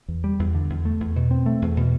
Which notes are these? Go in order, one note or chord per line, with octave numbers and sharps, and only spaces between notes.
E2
G3
E2
D3
E2
A3
E2
B2
C4
A3
E2
B2